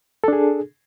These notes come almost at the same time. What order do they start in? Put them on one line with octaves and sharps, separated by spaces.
A4 D4 G#4